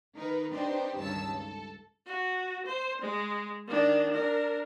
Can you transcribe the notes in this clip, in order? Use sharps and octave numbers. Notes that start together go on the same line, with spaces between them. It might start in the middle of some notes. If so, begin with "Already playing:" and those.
D#3 D#4 A#4 B4
C4 D4 D#4 G4 B4 C5
C#2 G2 D#3 C#5 A5 E6
A4
F#4
C5
G#3
D#3 D4
D4 A#4